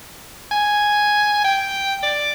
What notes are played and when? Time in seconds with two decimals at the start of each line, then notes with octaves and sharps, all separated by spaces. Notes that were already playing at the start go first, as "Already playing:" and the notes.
0.51 G#5
1.44 G5
2.03 D5